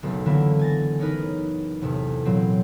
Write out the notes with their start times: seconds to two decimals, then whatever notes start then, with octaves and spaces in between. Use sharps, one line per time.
0.02 F#1 B1 A3
0.26 D3 E3 A#3 B3 E4
0.59 G#5 A6 A#6
1.00 C#4 D#4 A#4 B4
1.81 A1 E2 C3
2.25 A#2 E3 F#3 C4